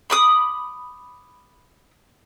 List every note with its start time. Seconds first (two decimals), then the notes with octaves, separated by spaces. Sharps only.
0.10 B5 D6 D#6